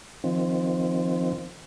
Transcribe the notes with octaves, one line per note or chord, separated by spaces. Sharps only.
D#3 F3 C4